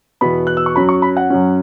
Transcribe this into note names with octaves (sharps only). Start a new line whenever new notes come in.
E2 B2 B3 B5
F#6
E6
C#6
F#2 F#3 C#4 B5
C#6
B5
F#5
F#2 F#3 C#4